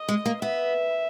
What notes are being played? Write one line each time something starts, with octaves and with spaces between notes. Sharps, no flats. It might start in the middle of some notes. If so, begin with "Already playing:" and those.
Already playing: D#5
G#3
A#3
B3 E5